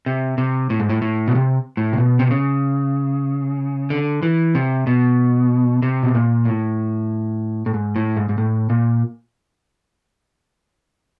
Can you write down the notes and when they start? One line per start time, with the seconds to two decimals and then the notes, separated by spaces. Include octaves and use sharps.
0.06 C3
0.38 C3
0.70 A2
0.80 G#2
0.90 A2
1.02 A2
1.28 B2
1.35 C3
1.77 A2
1.93 C3
1.98 B2
2.19 C3
2.31 C#3
3.90 D3
4.23 E3
4.55 C3
4.87 B2
5.82 C3
6.03 B2
6.15 A#2
6.45 A2
7.66 A2
7.74 G#2
7.96 A2
8.17 G#2
8.29 G#2
8.38 A2
8.70 A#2